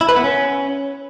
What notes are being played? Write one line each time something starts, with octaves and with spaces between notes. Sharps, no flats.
E4
B4
B3
C#4